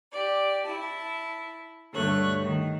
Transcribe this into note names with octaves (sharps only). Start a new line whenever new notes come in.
G4 D5
E4 A5
D2 G2 A3 C#5 F#6
D#3